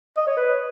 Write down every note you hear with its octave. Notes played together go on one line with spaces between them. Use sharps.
D#5
C#5
B4